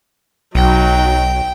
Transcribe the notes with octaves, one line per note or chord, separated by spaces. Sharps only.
B1 F#3 D#4 G5